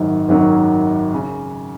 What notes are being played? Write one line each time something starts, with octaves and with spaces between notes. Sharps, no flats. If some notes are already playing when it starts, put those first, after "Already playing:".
Already playing: G#1 F#2 D#3 F#3
G#1 F#2 D#3 F#3
C#3